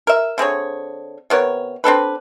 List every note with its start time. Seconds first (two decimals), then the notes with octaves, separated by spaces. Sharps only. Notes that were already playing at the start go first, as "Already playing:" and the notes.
0.07 A#4 E5
0.38 D3 C4 G#4 C#5
1.30 C3 B3 A#4 C#5
1.84 C4 D4 A4 B4